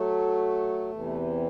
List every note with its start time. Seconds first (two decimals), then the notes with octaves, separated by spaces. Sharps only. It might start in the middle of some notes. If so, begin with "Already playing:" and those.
Already playing: F#3 A3
0.91 E2 C3 E3